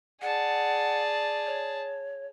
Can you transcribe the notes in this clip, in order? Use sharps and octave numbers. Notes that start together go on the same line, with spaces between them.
G#4 D5 F#5 A5
C#5